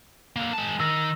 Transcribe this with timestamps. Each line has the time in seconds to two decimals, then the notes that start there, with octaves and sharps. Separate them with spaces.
0.36 D3 A#3
0.53 G#3 A5
0.80 D#3 E6 A#6